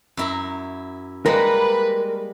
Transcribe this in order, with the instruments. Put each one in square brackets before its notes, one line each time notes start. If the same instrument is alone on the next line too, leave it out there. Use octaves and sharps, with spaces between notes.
[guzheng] F#2 E4 A#5
[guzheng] G3 G#3 A#3 [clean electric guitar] A#4 [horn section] B4